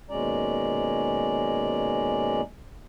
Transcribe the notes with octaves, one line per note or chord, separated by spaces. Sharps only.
D#2 B2 G#3 C#4 D5 A#5